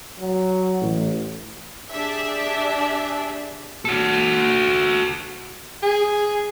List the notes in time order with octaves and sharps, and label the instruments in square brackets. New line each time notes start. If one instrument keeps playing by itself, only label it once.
[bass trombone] F#3
[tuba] A1
[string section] D4 G4 G#4 E5
[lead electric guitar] F#4 A4
[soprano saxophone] G#4